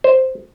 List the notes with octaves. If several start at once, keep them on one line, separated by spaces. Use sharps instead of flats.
C5